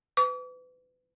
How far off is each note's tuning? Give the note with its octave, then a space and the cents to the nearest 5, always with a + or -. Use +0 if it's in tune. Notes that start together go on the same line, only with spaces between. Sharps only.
B4 +30 D6 -45